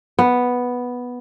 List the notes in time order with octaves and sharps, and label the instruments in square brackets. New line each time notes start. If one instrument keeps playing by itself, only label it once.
[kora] B3